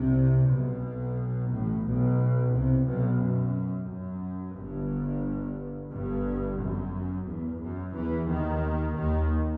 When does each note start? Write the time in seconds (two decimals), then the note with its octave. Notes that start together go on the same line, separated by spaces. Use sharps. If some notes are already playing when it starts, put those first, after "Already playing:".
Already playing: C2 C3
0.50 B1 B2
1.51 A1 A2
1.86 B1 B2
2.53 C2 C3
2.86 B1 B2
3.21 F#2
3.89 F#2
4.56 G1 G2
5.91 G1 G2
6.59 F#2
7.27 E2
7.61 F#2
7.94 E2 E3
8.29 D#2 D#3
8.96 D#2 D#3